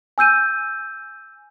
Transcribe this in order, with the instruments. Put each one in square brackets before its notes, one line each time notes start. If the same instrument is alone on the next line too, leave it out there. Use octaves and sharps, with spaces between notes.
[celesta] G#5 E6 G6 D#7